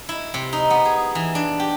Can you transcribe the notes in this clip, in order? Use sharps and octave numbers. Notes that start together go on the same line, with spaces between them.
E4
C3
D#4
B3
G#4
E3
D4
G4